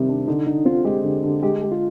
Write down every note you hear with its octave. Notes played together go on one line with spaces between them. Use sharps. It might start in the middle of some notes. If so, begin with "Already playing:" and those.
Already playing: C3 D#3 G3 C4
D4
D3 D#4
D3 D#4
C4 F4
G#3 G4
D3
D3
G#3 G4
G#3
F4